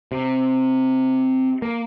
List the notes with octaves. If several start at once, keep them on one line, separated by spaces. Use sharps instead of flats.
C3
A#3